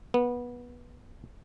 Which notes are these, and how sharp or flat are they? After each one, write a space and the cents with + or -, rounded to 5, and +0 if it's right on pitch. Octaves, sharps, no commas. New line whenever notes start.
B3 -20